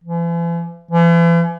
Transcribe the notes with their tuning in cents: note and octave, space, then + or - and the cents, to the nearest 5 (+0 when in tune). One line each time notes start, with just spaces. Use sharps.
E3 +45
E3 +45